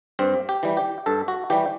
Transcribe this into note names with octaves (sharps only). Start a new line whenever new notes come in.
G2 C4
G4
E3 G3
G4
G2 A4
F#4
E3 G3 G4